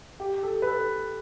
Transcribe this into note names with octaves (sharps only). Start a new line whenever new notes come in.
G4
A4
B4
A4